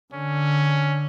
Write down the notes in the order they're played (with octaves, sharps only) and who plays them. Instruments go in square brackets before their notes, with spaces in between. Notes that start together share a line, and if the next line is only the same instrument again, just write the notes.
[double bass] D3 [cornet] C#4